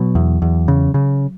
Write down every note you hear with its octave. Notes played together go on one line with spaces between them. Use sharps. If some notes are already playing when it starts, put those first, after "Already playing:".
Already playing: B2 F#3
E2
E2
C#3
C#3